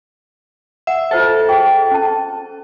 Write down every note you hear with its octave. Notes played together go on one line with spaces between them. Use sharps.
E5 F#5
F4 A4 C5 E5
G#4 G5
C#4 A5